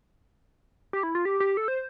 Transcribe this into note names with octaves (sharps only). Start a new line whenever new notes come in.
G4
E4
F4
G4
G4
A4
C5